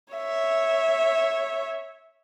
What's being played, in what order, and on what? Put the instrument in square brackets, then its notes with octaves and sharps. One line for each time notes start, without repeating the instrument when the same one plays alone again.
[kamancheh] C#5 E5